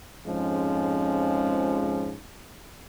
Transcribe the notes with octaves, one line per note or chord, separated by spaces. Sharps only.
F2 G#2 F3 G#3 C#4